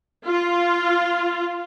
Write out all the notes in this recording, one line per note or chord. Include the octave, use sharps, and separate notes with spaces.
F4